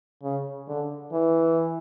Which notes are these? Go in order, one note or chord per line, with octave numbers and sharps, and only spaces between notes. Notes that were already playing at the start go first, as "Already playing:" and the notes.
C#3
D3
E3